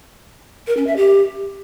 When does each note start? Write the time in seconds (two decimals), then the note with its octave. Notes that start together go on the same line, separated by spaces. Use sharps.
0.67 A#4
0.77 C#4
0.87 E5
0.97 G4